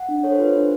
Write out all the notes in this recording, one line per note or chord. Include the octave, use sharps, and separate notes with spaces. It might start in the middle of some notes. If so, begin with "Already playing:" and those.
Already playing: F#5
D4
A4 C#5
C5
F4 B4
C5
D4